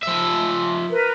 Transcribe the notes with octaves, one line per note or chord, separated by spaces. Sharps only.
F3 E5
A#4 B4